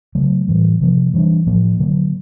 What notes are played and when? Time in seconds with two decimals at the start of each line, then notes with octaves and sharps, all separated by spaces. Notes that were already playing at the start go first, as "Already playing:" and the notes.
0.15 C#3 F#3 A3
0.48 A2 E3 G3
0.81 C3 F3 A#3
1.14 E3 G3 B3 D4
1.47 A2 F3 A#3
1.80 D3 F#3 A#3